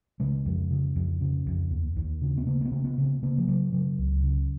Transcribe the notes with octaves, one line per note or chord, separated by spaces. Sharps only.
C#3 G#3
F2
C#3
F2
C#3
F2
D#2
D#2
C#3
B3
C#3 A#3
A#3
B3
C#3
B3
C#3
B3
C#3 A#3
F3
C#3 F#3
C#3 F#3
C#2
C#3